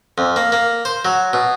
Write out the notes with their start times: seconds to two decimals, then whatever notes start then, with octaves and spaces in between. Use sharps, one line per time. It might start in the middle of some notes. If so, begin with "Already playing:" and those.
0.18 F2
0.36 A#3
0.52 A#3
0.85 C5
1.05 F#3
1.33 B2